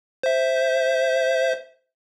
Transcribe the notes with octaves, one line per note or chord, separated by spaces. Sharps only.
C5 E5